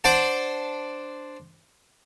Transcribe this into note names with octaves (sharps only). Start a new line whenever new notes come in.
D4 C5 D5 F#5 A5